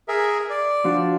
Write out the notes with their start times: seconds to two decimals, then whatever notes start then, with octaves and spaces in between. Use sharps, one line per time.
0.08 G#4 A#4 E5
0.50 D5
0.84 F3 D4 F#4